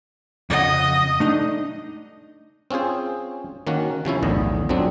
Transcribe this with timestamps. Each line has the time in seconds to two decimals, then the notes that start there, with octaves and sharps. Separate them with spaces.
0.50 F2 C#3 D#5 F#5
1.20 A3 D4 D#4
2.71 C4 C#4 F4 G#4 C5
3.67 D#3 A#3 C#4 F#4
4.05 C3 F3 C#4 E4
4.23 B1 E2 A2 D3 D#5
4.69 F2 F#3 G#3 C4 D4